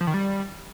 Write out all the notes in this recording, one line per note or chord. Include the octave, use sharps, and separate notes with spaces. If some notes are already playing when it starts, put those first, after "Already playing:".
F3
D#3
G3